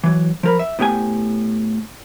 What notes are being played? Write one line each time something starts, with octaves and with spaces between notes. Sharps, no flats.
E3 F#3
F3 A#4 B5
E5
A2 B3 G4 G#5